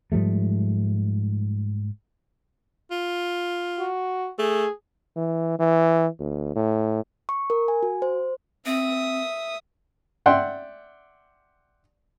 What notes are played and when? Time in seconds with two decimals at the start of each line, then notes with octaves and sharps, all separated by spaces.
0.12 G#2 F3 G3 A3
2.91 F4
3.79 F#4
4.39 A3 G#4
5.16 E3
5.59 E3
6.20 D2
6.55 A2
7.29 C#6
7.50 A#4
7.68 G#5
7.83 F#4
8.02 C5
8.66 C4 E5 D#6
10.26 D5 E5 F#5 G5 C6